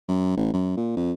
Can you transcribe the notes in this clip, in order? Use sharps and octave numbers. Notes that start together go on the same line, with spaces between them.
F#2
A1
F#2
A#2
F2